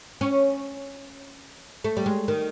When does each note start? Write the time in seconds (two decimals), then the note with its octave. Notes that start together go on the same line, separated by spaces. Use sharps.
0.21 C#4
1.84 A3
1.97 G3
2.06 G#3
2.28 D#3